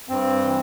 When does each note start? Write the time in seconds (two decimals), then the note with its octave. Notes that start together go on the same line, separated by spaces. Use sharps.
0.09 G2 C4
0.44 E3